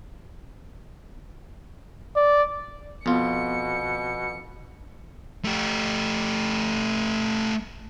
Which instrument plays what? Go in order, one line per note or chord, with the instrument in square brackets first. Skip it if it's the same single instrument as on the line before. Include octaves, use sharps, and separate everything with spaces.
[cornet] D5
[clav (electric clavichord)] F2 F4 [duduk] B2 [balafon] B3 [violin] C#7
[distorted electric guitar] A3 G4